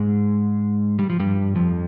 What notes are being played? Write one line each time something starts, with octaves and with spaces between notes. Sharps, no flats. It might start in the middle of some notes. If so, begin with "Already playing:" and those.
Already playing: G#2 G#3
G3
F3
G2 G3
F2 F3